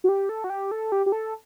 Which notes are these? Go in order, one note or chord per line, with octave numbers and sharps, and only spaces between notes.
F#4
G4
A4
F#4
G4
A4
G4
G4
A4